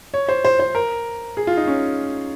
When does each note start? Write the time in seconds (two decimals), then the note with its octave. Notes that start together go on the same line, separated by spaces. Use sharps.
0.14 C#5
0.29 C5
0.45 C5
0.60 C5
0.75 A#4
1.37 G#4
1.47 F4
1.57 D#4
1.67 C#4